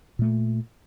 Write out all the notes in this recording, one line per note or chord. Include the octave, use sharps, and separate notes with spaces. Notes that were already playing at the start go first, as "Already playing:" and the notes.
A#2 A3